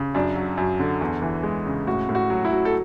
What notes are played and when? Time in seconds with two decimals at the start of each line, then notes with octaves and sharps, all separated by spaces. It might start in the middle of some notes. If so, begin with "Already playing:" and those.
Already playing: C#3
0.15 F#2 D4
0.36 F#3
0.57 F#2
0.80 D3
1.01 E2
1.22 E3
1.43 G#3
1.66 C#3
1.87 A2 F#4
2.09 A2
2.15 F#4
2.30 F#3
2.45 E4
2.51 F#3
2.65 A4